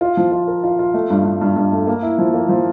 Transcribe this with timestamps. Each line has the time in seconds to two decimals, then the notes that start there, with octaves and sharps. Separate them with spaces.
0.01 F4
0.17 F3
0.32 F4
0.47 A#4
0.64 F4
0.79 F4
0.94 A3
1.10 G2
1.25 G2
1.41 G2
1.56 G2
1.72 A3
1.87 A#3
2.02 E4
2.19 F3
2.34 A#3
2.49 F3